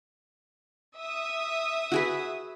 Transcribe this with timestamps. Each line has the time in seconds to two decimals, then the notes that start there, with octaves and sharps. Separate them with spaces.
0.98 E5 D#6
1.92 F#4 G#4 B4